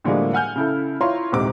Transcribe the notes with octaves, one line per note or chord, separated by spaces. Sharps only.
A2 D3 F3 G3 G#3 A#3
F#5 G#5 F6 G6
C#3 E4 A4
E4 F4 C#5 A#5 C6
D#1 G#2 C3 D6